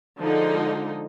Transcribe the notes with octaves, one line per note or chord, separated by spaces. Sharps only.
D3 F3 G#3 D#4